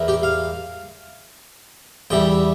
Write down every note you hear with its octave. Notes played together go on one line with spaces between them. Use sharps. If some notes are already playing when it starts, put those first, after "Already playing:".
Already playing: E2 E3 A#3
G4
F5
E2 E3 G3 G5